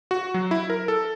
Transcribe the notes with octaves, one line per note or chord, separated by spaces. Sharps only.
F#4
F#3
E4
A#4
A4